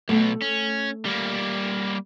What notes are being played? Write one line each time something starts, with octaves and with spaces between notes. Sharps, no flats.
B1 B2 A3
C#4
G3 A#3